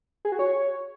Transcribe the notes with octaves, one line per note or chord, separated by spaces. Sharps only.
G#4
F#4
C#5